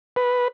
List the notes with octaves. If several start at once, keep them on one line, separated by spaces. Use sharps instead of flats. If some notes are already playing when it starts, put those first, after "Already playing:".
B4